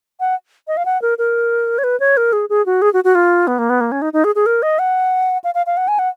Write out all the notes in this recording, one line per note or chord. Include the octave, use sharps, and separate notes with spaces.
F#5
D#5
F5
F#5
A#4
A#4
C#5
B4
C#5
A#4
G#4
G#4
F#4
G#4
F#4
F#4
F4
B3
A#3
B3
A#3
C#4
D#4
D#4
G#4
G#4
A#4
D#5
F#5
F5
F5
F5
F#5
G#5
F#5